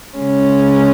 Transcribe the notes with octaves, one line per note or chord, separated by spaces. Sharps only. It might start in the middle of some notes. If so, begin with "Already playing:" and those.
C#3 G#3 C#4